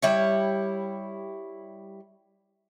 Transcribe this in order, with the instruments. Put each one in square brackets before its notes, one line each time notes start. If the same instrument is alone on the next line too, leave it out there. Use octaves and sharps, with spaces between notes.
[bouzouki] G3 E4 C#5